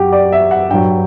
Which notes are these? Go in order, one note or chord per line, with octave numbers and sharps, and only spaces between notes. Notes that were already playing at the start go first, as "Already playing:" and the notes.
Already playing: F#2 F#3 F#4 G4
D5
E5
F#5
G2 F#3 G5